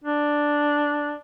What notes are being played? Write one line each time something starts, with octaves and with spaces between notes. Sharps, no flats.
D4